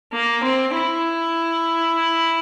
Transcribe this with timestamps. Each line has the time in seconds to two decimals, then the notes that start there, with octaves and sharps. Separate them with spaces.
0.13 A#3
0.44 C4
0.75 E4